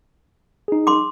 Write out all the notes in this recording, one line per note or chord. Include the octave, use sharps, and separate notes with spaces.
D#4 G#4
C6 D6